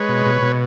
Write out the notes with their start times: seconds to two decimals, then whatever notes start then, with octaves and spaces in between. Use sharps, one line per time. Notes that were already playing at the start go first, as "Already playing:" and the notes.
Already playing: G#3 B4 C#5
0.09 B2
0.26 B2
0.42 B2